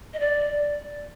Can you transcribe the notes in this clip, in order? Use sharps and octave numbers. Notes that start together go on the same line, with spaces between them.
D#5
D5